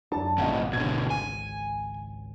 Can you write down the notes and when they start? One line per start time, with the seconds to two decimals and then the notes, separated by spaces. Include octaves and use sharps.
0.12 F#2 D4 A5
0.38 G#1 C#2 A#2 C#3 D#5 F#5
0.73 B2 D3 G#6
1.10 G#5